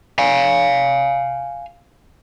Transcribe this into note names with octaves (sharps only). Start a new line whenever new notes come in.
F5 G#5